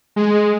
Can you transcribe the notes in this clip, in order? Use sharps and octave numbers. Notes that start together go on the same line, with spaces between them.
G#3